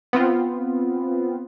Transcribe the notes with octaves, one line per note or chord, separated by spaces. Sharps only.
B3 C4 F4